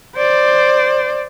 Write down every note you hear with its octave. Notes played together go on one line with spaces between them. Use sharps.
C5 D5